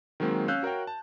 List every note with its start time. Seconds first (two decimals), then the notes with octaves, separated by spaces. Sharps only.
0.20 D#3 F#3 G#3 A#3 C4
0.48 C#4 F5 E6 F#6 G6
0.63 F#4 A#4 C#5 F5 G5
0.87 A5